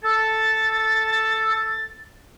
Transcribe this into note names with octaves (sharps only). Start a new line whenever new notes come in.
A4 A6